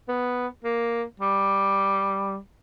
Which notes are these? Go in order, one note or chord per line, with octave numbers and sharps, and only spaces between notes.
B3
A#3
G3